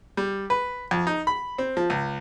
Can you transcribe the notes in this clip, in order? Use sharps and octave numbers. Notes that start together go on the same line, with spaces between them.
G3
B4
F2
D#4
B5
C4
F3
C#2